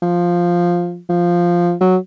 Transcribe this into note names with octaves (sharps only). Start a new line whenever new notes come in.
F3
F3
F#3